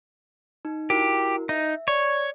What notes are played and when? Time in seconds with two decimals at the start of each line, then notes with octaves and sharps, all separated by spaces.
0.65 D#4
0.90 E4 F#4 G4 A#4
1.49 D#4 E5
1.88 C#5 D5